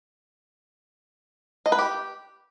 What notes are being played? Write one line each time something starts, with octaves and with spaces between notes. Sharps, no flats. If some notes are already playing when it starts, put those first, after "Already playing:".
D#5
B4
G4